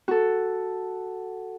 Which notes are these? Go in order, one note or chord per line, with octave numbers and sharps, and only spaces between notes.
F#4 A4